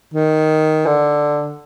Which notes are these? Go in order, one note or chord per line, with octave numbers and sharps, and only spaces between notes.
D#3
D3